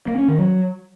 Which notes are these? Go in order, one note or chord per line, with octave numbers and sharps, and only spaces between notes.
A#3
C#4
D#3
F#3